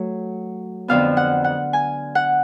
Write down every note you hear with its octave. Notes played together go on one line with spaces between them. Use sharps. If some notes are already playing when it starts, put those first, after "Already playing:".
Already playing: F#3 A3
F2 D3 F3 B3 F5
F#5
F#5
G#5
F#5